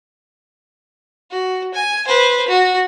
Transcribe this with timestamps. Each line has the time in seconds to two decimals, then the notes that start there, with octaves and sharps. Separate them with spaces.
1.30 F#4
1.74 G#5
2.07 B4 C5
2.48 F#4